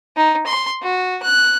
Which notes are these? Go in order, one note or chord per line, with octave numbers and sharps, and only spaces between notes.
D#4
C6
F#4
F#6